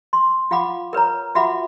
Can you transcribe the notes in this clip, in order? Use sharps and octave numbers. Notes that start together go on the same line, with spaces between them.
C6
F4 F5 F#5 B5 D6
A#4 B4 C#5 A#5
F4 F#4 E5 F#5 B5 D6